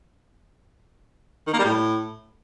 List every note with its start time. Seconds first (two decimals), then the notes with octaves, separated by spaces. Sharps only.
1.47 D#3
1.53 A#3
1.59 G3
1.65 A2